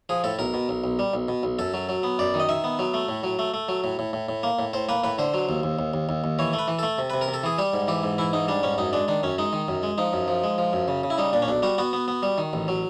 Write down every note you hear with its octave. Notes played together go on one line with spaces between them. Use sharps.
F3 G#4
A2 A4
B1 A#4
B2
B1
B1
G3
B1
B2
B1
F#2 A4
F#3
F#3
B3
F#2 D5
D#3
D#5
D#3 E5
B3
F#3
A3
A2
F#3
A3
A3
F#3
A2
A2
A2
A2
A#3
A2
A2 C5
A#3 B4
A2 B4
D3 C5
F#3
D#2
D#2
D#2
D#2
D#2
D#2
E3 C#5
A3
B4
E3
A3 A4
C3
C3 B4
A#4
C3
A4
E3 G#4
G3 G4
G#2
E3 G4
G#2
E3 E4
G#2 D#4
G3 D4
G#2 C#4
F#2 D#4
G#3 D4
D#3 D4
F#2 C#4
G#3 D#4
D#3
F#2
G#3
F3 D#4
F#2
F3
G#3
F3
F#2
C#3
C#3
E4
G3 D#4
A#2 D4
C#4
B1 D4
G3 F#4
B3 F#4
B3
B3
G3
D#3
A1
F#3